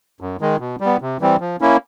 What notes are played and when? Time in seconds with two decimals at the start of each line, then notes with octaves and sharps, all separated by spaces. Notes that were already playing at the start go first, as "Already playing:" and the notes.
0.21 F#2
0.41 D#3 G#3
0.60 B2
0.80 G3
0.86 B3
1.01 C3
1.21 E3 G3 C4
1.40 F3
1.61 A#3 C#4 E4